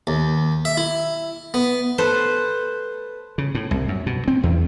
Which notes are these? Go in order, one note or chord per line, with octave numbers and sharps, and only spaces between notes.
D#2
E5
E4
B3
A4 B4 C5
C#3
A2
C2
F#2
B2
C4
E2